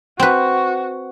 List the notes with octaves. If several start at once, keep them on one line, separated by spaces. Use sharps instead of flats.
C4 F#4 B4